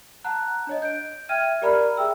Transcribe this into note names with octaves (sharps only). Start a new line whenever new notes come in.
F#5 A5 A#5 F#6
D4 C#5 D#5
G6 D7
E5 G5 F6 G#6 D#7
G4 A#4 D5 A#5 B5 F6
G#4 E5 G5 E6